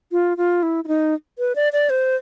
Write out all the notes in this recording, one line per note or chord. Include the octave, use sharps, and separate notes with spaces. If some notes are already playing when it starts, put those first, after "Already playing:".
F4
F4
E4
E4
D#4
B4
D5
D5
C5